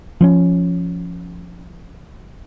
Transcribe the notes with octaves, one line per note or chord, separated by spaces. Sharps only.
F3 C4 C#4